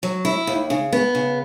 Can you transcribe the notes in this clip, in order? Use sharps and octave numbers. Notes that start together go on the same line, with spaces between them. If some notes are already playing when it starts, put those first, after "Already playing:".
F#3
E4
D#2
C#3
B3
C#3